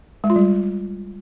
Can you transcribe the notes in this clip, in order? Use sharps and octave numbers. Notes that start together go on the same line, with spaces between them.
G#3
F4
G3